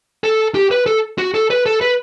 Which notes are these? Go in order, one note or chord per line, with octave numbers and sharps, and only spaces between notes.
A4
G4
B4
A4
F#4
A4
B4
A4
B4